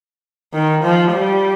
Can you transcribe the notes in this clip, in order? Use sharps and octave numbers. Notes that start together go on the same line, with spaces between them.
D#3
F3
G3